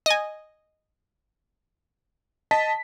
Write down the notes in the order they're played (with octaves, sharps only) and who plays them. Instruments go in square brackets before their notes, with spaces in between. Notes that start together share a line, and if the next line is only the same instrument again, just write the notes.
[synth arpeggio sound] D#5 G#5
[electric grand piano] D#5 A5 B6